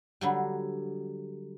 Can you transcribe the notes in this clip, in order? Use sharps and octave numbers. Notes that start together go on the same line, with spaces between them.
D3 F#3 G3